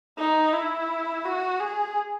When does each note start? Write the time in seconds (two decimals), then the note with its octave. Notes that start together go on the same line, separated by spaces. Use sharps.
0.18 D#4
0.53 E4
1.24 F#4
1.60 G#4